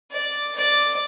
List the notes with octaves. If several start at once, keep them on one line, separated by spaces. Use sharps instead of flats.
D5
D5